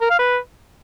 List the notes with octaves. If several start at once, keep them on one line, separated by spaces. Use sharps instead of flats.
A#4
F5
B4